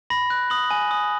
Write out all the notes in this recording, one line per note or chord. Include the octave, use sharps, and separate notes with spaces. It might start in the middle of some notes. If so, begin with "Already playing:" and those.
B5 A#6
F#6
D#6 F#7
G#5
D#6